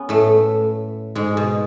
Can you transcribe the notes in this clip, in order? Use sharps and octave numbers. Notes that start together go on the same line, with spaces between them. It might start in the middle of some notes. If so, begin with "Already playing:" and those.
Already playing: B3 C#4
A2 A3
G#2 G#3
B2